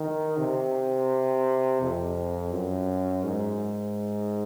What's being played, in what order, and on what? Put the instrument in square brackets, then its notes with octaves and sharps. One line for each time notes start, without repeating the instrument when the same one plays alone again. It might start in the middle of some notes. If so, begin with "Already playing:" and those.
Already playing: [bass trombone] D#3
C3
F2
F#2
G#2